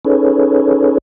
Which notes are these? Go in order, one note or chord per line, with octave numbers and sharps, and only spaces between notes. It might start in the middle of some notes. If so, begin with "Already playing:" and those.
C#4 D#4 G#4 A4 B4 C#5